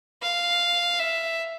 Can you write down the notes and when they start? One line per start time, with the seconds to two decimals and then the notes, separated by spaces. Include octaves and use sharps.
0.22 F5
0.99 E5